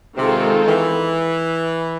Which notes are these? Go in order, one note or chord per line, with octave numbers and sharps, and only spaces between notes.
C3 D#3 G#3 C4 F4 A4
E3